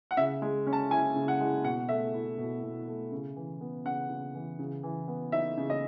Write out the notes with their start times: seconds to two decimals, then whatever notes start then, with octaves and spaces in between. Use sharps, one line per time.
0.11 F#5
0.17 C#3 E5
0.42 G#3
0.67 C#4
0.73 A5
0.91 E4 G#5
1.16 C#3
1.28 F#5
1.40 G#3
1.64 B2 F#5
1.89 A3 E5
2.14 E4
2.38 B2
2.63 B2
2.87 A3
3.12 C#3
3.36 E3
3.61 B3
3.85 C#3 F#5
4.10 C#3
4.35 E3
4.59 C#3
4.83 E3
5.08 B3
5.32 D#4 E5
5.58 C#3
5.70 D#5